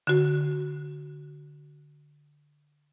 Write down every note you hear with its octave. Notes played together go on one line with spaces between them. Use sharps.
D3 F#4